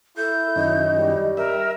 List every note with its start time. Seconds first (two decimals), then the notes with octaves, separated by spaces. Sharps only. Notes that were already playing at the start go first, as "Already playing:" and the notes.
0.17 E4 A4 G6
0.56 F#2 D#3 C#4 D#5
0.97 G3
1.37 A#4 E5